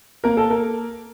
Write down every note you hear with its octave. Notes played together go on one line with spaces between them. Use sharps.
A#3 A#4
A4
A#4